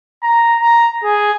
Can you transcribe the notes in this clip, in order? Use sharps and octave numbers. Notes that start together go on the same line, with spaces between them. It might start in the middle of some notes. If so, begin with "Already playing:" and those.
A#5
A#5
G#4